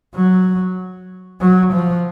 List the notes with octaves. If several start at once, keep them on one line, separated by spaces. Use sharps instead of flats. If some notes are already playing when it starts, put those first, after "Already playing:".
F#3
F#3
F3